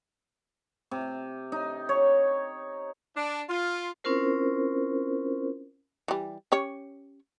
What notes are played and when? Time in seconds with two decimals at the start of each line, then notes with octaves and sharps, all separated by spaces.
0.91 C3
1.52 D#4
1.89 C#5
3.15 D4
3.49 F4
4.04 C4 C#4 E4 F4 A#4 C5
6.08 E3 G3
6.52 C#4 G4 C#5